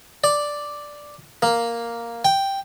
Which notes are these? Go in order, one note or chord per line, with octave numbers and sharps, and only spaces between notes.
D5
A#3
G5